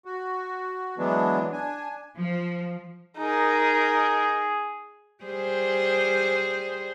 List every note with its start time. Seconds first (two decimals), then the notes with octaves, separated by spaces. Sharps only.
0.05 F#4
0.98 E3 F#3 G#3 B3 D4
1.53 D4 G#5
2.17 F3
3.17 D#4 G#4 A#4
5.24 G3 G#4 C5